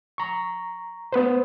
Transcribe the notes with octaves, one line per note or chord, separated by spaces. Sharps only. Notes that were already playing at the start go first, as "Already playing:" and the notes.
A#5 C#6
B3 B4 C5